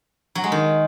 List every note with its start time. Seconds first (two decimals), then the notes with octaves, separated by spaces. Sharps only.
0.35 F#3
0.44 G#3
0.52 D#3